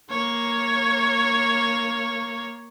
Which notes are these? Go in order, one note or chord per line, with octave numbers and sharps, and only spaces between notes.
A#3 C#5